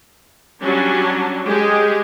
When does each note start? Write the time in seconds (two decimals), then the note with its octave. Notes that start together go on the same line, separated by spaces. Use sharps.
0.62 F#3 G3 C#4 D4 F#4
1.44 G#3 G4 G#4